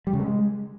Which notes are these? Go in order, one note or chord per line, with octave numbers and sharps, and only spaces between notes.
G3
C#3
G#3